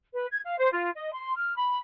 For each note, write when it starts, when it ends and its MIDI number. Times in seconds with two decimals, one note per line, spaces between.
0.13 0.26 71
0.31 0.40 92
0.45 0.59 77
0.59 0.71 72
0.72 0.90 65
0.95 1.13 75
1.13 1.35 84
1.37 1.54 89
1.57 1.78 83